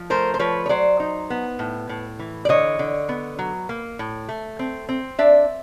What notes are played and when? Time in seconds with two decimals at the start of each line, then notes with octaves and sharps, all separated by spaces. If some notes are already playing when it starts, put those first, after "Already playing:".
Already playing: F3
0.10 A3 A#4 C5
0.34 C5
0.39 F3 B4 C#5
0.66 C#5
0.69 F#3 C5 D5
1.00 D#4
1.30 B3
1.59 A2
1.89 A2
2.19 E3
2.45 D5
2.49 D3 C#5 D#5
2.79 D3
3.09 B3
3.39 F#3
3.69 A#3
3.99 A2
4.29 A3
4.59 C4
4.89 C4
5.19 D4 D5 E5